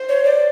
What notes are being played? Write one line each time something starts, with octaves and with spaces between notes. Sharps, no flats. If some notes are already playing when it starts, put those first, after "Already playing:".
Already playing: C5
C#5
D5